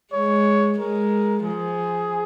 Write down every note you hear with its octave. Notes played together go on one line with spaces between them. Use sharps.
G#3 C#5
G#3 A#4
F3 G#4